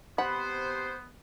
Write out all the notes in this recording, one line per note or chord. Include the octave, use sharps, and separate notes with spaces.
C3 B3 C5 F#5 B5